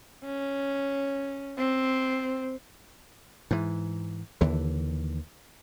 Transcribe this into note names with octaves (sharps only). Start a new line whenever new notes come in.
C#4
C4
G#2 E3
D#2 D3 E3